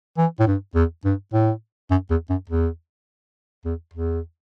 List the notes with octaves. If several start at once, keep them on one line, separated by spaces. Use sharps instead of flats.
E3
A2
G2
E2
G2
A2
F#2
E2
F#2
E2
E2
E2